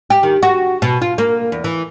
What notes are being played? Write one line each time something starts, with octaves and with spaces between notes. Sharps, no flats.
G4
D#3
F#4
B2
F4
A#3
E2
E3